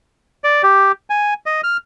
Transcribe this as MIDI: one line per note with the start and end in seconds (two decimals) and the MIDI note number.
0.44 0.62 74
0.63 0.92 67
1.10 1.34 80
1.46 1.61 75
1.64 1.77 89